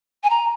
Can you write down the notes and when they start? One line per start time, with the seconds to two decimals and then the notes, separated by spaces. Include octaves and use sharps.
0.23 G#5
0.29 A#5